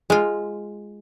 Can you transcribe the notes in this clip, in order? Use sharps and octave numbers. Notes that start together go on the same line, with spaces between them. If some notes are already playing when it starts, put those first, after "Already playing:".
G#3 F4